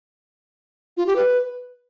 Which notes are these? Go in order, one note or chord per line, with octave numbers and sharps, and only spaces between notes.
F4
G4
B4